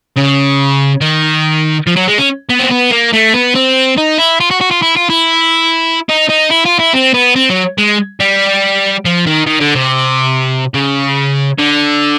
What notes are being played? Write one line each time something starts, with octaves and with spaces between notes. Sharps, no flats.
C#3
D#3
F3
F#3
G#3
C#4
B3
C4
B3
A#3
A3
B3
C4
D#4
E4
F4
F#4
F#4
F4
E4
F4
E4
D#4
D#4
E4
F4
E4
C4
B3
C4
F#3
G#3
G3
F3
D#3
D#3
D3
C3
C#3
D3